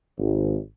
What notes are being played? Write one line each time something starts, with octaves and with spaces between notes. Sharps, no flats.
G#1